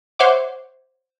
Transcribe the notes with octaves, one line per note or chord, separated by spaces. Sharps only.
C5 C#5 E5 F#5 D6